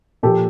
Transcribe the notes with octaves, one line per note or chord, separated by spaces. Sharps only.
A#2 F3 A#3 G4 A4